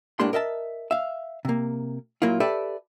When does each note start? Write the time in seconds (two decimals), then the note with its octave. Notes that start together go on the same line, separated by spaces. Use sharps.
0.20 A2 G#3 A#3 D4 G4 C6
0.33 A#4 D#5 E5 A5
0.91 E5 F5
1.45 C3 A#3
2.22 A#2 F#3 A#3 E4 F4
2.40 G4 A4 B4 D5 E5